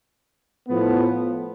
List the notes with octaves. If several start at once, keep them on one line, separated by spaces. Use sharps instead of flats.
A2 F3 B3